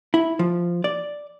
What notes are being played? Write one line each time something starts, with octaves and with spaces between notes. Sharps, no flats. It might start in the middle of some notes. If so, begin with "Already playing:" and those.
E4
F3
D5